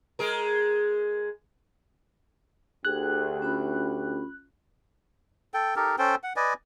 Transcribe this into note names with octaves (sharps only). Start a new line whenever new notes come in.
G#3 G#4 A#4
D2 G4 G#4 F#6
C#4 F4 B5
A4 G5
D#4 G4 A4 A#4
C#4 A4 C5 G5
F#5
B4 D5 D#5 G#5